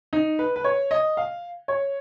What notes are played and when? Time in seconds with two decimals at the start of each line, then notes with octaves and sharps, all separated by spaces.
0.13 D#4
0.39 B4
0.56 B4
0.64 C#5
0.91 D#5
1.17 F5
1.68 C#5